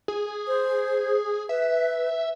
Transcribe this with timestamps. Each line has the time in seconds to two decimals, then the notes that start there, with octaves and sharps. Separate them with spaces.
0.08 G#4
0.47 C5
1.49 B4 E5